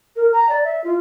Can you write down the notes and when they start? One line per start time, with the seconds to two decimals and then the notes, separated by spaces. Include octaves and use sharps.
0.16 A#4
0.33 A#5
0.49 D5
0.64 E5
0.84 F4